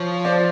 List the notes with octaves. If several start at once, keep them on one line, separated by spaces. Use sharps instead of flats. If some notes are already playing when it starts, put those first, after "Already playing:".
Already playing: F3 C#5
C5 D5